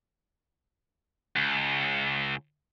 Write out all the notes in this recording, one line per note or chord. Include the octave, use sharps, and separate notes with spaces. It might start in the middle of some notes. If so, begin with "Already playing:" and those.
C#2